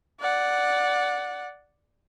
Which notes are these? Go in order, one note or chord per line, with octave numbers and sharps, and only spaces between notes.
D5 F#5